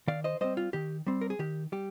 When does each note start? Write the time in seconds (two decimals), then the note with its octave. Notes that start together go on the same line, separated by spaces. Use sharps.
0.07 D#3 D5 F5
0.24 C5 D#5
0.41 G3 C4 C5 D#5
0.57 F4
0.73 D#3 G4
1.07 G3 C4
1.21 A#4
1.30 G#4
1.39 D#3 G4
1.72 G3 G4